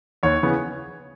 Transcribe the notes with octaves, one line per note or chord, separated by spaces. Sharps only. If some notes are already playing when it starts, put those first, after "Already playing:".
D#2 C#5
C#3 E3 B3